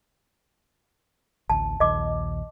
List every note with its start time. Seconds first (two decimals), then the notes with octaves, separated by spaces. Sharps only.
1.50 A1 D2 A5
1.80 A#1 D#2 D#5 D6